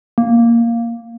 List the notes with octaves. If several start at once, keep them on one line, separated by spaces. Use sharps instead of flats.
A#3